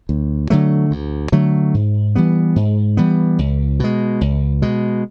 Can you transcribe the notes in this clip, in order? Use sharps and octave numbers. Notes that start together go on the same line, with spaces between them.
D2
D3 F#3 A3
D2
D3 F#3 A3
G#2
E3 G3 B3
G#2
E3 G3 B3
C#2
B2 G#3
C#2
B2 G#3